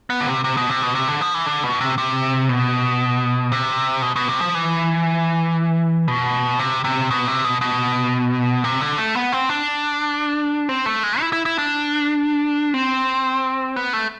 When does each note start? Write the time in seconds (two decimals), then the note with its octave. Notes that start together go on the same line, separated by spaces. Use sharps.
0.10 B3
0.21 D3
0.27 C3
0.44 C3
0.57 B2
0.70 C3
0.83 B2
0.95 C3
1.08 D3
1.21 F3
1.34 E3
1.46 D3
1.64 B2
1.81 C3
1.98 C3
2.49 B2
3.52 C3
4.02 B2
4.16 B2
4.28 C3
4.41 F3
4.55 E3
6.08 B2
6.59 C3
6.84 C3
7.10 B2
7.27 C3
7.44 B2
7.61 B2
8.64 C3
8.81 D3
8.98 A3
9.15 B3
9.32 C4
9.49 D4
10.69 C4
10.86 A3
11.03 G#3
11.20 E4
11.33 E4
11.46 E4
11.58 D4
12.74 C4
13.76 B3
13.93 A3